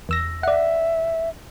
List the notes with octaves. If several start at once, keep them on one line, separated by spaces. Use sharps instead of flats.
E2 E6 A#6
D5 E5 F#5